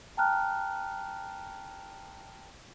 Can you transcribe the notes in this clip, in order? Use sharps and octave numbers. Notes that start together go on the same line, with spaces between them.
G5 A5 A#5 F6 F#6